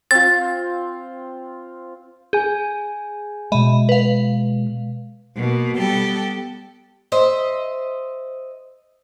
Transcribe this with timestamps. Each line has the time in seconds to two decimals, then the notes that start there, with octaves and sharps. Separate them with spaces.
0.11 C4 F4 A6
2.33 G#4 G#5 G6
3.52 B2 G#3 D#5 E5 B5
3.89 B4 F5
5.37 B2 A#3
5.79 G3 B3 G4 A4
7.12 C5 D#5 E5